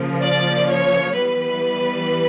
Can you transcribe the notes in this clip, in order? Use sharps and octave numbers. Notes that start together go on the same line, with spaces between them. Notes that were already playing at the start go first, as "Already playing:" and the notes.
Already playing: C#3 F3 A#3
D5
C#5
E3 G3 B3 B4